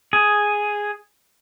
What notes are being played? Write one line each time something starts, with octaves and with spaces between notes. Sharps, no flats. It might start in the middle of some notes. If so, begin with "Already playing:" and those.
G#4